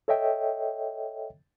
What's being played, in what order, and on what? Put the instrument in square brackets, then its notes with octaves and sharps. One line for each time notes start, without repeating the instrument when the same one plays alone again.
[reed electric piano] A4 C#5 D#5 E5 G5